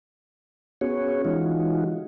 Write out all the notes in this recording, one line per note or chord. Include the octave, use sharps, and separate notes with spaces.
B3 C#4 F#4 G#4 C#5
E3 G#3 D#4 F4 F#4